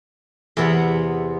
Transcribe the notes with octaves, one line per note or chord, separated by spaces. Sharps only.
E2 C3 B3 E5 F#5 B5